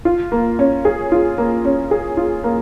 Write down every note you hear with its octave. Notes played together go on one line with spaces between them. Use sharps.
F4
A#3
C#4
G#4
F4
A#3
C#4
G#4
F4
A#3